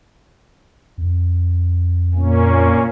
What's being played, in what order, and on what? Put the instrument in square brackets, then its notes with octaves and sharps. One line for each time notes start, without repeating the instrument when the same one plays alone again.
[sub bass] F2
[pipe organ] A#2 A#3 C#4